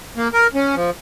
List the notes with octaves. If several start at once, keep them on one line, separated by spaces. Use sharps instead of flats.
A#3
A#4
C#4
F3